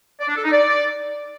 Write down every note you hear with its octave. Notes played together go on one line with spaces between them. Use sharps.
D5
D4
A4
D#4
D5